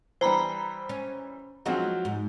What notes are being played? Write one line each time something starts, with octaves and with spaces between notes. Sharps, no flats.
E3 G3 C5 A#5 B5
C#4
F3 F#3 G#3 C4 D#4 F#4
G#2